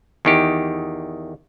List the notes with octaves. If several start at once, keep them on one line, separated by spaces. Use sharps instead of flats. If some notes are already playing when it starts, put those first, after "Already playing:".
E2 D#3 G4